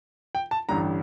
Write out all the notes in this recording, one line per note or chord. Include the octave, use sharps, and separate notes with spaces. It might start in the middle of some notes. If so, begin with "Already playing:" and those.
G5
A5
A1 G2 D3 A#5